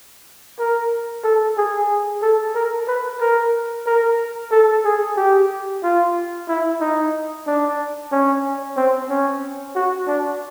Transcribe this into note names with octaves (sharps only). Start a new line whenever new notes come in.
A#4
A4
G#4
A4
A#4
B4
A#4
A#4
A4
G#4
G4
F4
E4
D#4
D4
C#4
C4
C#4
F#4
D4